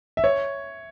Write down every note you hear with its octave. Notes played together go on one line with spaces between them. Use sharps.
E5
C#5